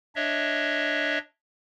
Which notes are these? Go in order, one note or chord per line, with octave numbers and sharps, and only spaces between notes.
D4 C#5 D#5 E5